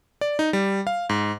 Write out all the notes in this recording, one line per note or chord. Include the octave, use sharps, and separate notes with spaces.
D5
D#4
G3
F5
G#2